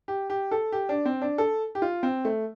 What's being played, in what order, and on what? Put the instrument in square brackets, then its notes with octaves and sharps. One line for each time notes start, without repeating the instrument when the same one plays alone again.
[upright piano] G4
G4
A4
G4
D4
C4
D4
A4
G4
F4
C4
A3